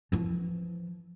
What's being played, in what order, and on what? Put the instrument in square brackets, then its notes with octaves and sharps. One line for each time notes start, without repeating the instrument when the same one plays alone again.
[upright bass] E3 F3